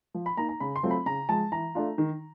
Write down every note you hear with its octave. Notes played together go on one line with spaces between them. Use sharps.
F3
B5
A#3 D#4 A#5
A#5
C#3 B5
C6
F#3 A3 C4 F4
B5
C#3 A#5
F3 G#3 A5
E3 A#5
A3 D4 F4
D#3